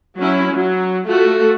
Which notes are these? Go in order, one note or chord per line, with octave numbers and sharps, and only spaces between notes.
F#3 C#4 E4
F#3
A3 F4 F#4 A4